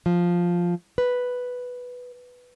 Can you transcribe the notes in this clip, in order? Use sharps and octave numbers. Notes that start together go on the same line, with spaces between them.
F3
B4